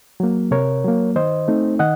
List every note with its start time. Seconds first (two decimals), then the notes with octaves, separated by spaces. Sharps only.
0.20 F#3 A#3
0.51 C3 A#4 C#5
0.84 F#3 A#3
1.16 D#3 C5 D#5
1.48 A3 C4 D#4
1.79 D#3 D#5 F#5